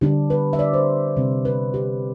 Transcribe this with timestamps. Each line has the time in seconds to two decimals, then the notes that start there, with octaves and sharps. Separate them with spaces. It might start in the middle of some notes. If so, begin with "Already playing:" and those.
0.01 D3 G3 D4 G4
0.30 B4
0.53 E5
0.59 D5
0.73 C5
1.16 C3 G3 C4
1.45 B4
1.74 G4